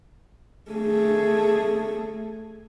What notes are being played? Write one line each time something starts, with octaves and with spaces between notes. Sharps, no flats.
A3 G#4